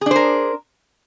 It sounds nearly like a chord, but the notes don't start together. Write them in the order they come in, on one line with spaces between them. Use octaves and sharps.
G#4 D4 C5 A#4